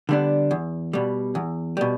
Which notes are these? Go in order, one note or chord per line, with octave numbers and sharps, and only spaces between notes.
D3 G3 B3 D4
E2
B2 G3
E2
B2 G3